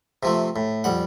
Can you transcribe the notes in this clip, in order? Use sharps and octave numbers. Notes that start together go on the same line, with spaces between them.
C3 F3 A3
A2
F2 G3 F#5